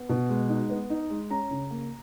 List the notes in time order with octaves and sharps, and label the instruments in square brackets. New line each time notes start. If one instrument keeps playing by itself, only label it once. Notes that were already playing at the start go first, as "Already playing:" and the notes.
Already playing: [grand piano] B3
B2
G#3
D#4
B3
D#4
G#3
C#4 A#5
C#3
A#3